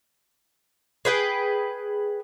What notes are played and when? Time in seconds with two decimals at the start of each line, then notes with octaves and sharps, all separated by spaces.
1.05 G#4 B4 G5